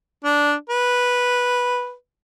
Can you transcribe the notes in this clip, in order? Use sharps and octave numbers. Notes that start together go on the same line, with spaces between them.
D4
B4